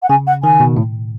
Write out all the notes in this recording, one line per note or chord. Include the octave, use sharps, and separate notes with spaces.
F#5
C#3 G#5
F#5
D#3 G#5
B2
A2